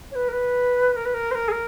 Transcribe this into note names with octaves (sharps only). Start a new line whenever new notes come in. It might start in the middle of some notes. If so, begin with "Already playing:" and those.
C#5
B4
A#4
B4
A#4
B4
A#4
C5
A#4
G#4
A#4